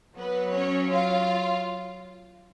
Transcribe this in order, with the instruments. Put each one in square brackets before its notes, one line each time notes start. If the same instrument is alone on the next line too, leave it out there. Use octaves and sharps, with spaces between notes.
[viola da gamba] F#3 [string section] B3 B4
[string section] C#4 C#5
F4 F5